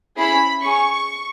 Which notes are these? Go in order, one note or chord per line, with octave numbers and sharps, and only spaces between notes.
C#4 E4 G#4 B5
C#4 G#4 C#6